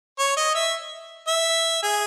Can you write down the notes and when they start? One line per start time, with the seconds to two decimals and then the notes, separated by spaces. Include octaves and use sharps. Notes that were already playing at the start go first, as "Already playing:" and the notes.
0.19 C#5
0.37 D#5
0.55 E5
1.28 E5
1.82 G#4